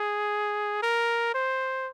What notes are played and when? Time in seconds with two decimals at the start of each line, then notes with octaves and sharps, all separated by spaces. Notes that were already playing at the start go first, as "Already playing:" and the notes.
Already playing: G#4
0.82 A#4
1.35 C5